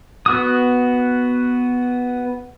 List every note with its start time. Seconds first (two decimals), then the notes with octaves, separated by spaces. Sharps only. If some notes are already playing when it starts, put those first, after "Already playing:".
0.26 B3 F#4 D#6